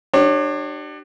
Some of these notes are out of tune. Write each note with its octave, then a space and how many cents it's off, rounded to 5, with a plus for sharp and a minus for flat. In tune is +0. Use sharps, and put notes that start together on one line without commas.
D4 +30 G4 -30 C#5 -15